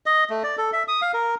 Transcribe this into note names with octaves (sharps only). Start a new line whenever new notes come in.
D#5
A3
D5
A4
E5
D#6
F5
A#4